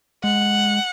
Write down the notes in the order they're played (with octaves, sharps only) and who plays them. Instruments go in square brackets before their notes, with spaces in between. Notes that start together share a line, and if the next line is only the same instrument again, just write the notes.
[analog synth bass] G#3 [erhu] F#5